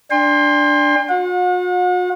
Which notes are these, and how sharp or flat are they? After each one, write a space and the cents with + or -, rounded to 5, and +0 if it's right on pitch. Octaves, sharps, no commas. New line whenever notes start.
D4 +0 G5 +40 C6 +10
F#4 -45 F#5 -40